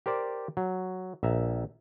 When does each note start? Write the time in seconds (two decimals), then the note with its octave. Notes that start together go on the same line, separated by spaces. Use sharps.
0.06 G4 A#4 C5 D5
0.57 F#3
1.23 A#1 E5 A#5